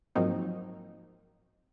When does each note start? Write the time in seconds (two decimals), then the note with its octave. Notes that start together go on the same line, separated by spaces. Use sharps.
0.15 G#2 F3 F#3 A#3 C4 D#4